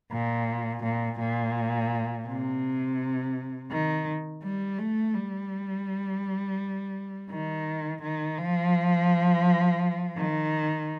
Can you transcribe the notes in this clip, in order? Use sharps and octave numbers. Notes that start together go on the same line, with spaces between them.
A#2
A#2
A#2
C3
D#3
G3
A3
G3
D#3
D#3
F3
D#3